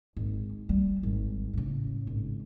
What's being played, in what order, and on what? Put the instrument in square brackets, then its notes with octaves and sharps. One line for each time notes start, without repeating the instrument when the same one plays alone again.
[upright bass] G#1
G3 A3
G#1
A2 C#3
G#1